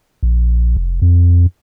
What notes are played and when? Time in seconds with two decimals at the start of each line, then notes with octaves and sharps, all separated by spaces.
0.23 A#1
0.76 F1
1.02 F2